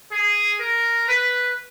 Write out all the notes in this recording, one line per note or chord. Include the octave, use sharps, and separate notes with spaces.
G#4
A#4
B4